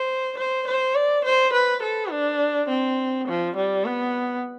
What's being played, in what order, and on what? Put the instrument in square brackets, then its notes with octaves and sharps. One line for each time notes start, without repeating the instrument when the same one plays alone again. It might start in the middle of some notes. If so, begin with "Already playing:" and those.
Already playing: [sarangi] C5
C5
C5
D5
C5
B4
A4
D4
C4
F3
G3
B3